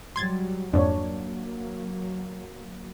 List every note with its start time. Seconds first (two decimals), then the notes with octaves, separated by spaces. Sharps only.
0.16 F#3 G3 C6 G#6 A6
0.73 F2 G#2 F#3 A#3 D4 C#5